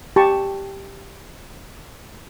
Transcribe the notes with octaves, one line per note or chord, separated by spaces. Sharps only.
G4 A5 C#6